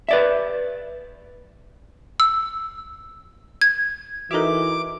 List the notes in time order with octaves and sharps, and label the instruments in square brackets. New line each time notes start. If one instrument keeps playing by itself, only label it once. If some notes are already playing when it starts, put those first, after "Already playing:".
[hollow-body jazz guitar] B4 D5 E5
[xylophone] E6
G#6
[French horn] E3 [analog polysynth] D#4 E5 [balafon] F#4 A4 A#4 [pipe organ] D6